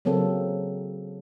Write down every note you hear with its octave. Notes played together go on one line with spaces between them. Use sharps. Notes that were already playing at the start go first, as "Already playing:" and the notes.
C#3 F#3 A#3 C4 A4